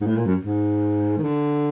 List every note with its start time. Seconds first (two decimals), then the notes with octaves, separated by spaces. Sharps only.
0.01 G#2
0.07 A2
0.16 A#2
0.25 F#2
0.45 G#2
1.18 D#3
1.23 D3